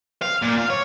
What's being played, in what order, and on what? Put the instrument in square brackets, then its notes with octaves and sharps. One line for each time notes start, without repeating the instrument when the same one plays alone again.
[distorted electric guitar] F5
A#2
F5
C#5